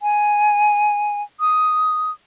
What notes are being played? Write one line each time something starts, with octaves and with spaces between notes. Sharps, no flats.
G#5
D#6